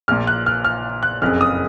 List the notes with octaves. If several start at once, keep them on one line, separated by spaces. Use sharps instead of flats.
A#1 A#2 F6
F#6
F6
F6
F#6
F#1 F2 C#3 F6
D#6